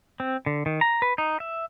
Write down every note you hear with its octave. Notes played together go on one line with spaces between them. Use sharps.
C4
D3
D#3
A#5
B4
D#4
E5